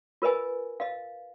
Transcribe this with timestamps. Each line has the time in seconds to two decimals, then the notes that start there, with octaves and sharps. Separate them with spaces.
0.22 F4 A#4 B4 D#5 G#5
0.80 D#5 F5